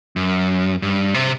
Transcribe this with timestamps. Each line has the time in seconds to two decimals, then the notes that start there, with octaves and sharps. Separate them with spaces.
0.16 F#2
0.82 G2
1.14 C3